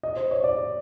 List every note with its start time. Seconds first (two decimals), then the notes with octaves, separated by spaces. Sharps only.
0.03 D#5
0.16 C5
0.31 C#5
0.44 D5